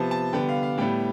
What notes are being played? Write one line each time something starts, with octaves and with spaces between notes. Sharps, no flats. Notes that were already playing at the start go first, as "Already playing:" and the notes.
Already playing: C3 F3 B3 A5
A5
D3 G3 B3 G5
F5
F5
A2 G3 B3 G5